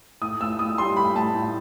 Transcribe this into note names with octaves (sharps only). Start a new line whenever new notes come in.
A2 D#6
A2 E6
A2 D#6
G3 C6
A2 B5
A2 A5
A2